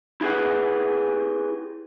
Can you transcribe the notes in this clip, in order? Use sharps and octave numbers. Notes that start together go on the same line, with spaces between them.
E4 G4 G#4 B4 F#5